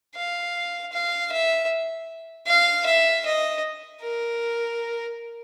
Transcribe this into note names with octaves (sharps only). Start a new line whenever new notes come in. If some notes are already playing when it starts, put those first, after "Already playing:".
F5
F5
E5
F5
E5
D#5
A#4